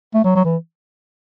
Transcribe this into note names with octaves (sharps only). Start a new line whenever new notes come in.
A3
F#3
F#3
E3